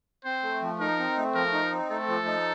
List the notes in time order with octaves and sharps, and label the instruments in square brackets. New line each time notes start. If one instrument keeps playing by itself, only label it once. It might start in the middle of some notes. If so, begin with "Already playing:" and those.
[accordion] C4 [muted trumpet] C5
[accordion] A3
F3
[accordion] D#4 [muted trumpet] A#4
[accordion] C4
A3
[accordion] F3 [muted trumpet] A#4
[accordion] D#4
C4
[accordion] A3 [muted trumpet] A4
[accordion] F3
D#4